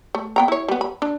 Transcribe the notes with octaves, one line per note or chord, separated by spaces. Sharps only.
A3
B3 G5 A#5
E4 C#5
G3 B3
B5
D4